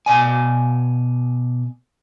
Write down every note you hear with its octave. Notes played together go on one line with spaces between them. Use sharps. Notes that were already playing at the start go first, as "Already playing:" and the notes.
B2 D5 G#5